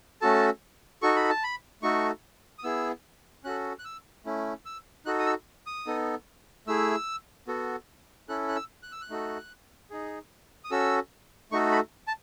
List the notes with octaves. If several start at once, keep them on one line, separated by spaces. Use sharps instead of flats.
A3 C#4 F#4 A4 A5
D#4 F#4 A4 C#6
B5
A5
B5
A3 D#4 F#4 A4 C#6
D#6
B3 E4 G#4 E6
C#4 F#4 A4 F#6
F#6
E6
A3 C#4 E4
E6
D#4 F#4 A4 F#6
D#6
E6
D#6
B3 D#4 A4
A3 E4 G#4 E6
B3 F#4 A4
C#4 E4 A4 F#6
F#6
E6
F#6
E6
F#6
A3 D#4 F#4 A4
D#4 G#4
D#6
C#4 F#4 A4 E6
A3 D#4 F#4 A4 C#6
B5
A5